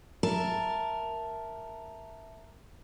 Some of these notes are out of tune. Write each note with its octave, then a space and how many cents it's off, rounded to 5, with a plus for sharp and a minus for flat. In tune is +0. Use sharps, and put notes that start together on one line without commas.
A#4 +0 E5 +0 A5 +0